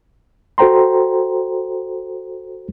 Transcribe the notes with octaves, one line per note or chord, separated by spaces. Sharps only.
F#4 A4 C5 G5 A#5 C6